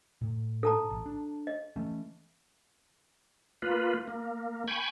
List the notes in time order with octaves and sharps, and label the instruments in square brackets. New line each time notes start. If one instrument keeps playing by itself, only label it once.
[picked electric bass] A2
[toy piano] A4 A5 A#5
[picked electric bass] A1
D4
[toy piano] D#5
[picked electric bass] E3 A3 C#4
[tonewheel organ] A#3 F4 B4
A#3
G5 G#5 B5 C#6